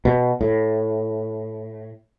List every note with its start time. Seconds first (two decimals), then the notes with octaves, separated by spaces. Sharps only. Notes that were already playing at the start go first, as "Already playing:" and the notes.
0.05 B2
0.41 A2